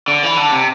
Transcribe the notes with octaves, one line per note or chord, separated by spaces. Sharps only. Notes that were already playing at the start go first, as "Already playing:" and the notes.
D3
E3
D3
C3